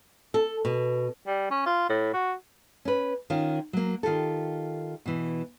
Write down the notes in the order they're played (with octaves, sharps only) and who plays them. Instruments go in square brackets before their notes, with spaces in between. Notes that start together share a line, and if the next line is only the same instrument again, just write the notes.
[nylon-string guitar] A4
B2
[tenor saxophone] G3
C#4
F4
A2
F#4
[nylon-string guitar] C#4 B4
D#3 C#4 F4
F#3 A#3
D#3 F4 G4 A4
B2 E3